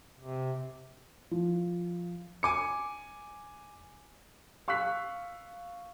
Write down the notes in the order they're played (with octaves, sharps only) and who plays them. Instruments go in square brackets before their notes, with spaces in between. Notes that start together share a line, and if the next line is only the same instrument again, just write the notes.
[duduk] C3
[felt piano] F3
[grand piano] G#5 D6 C#7
[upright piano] F5 C#6 E6 F#6 B6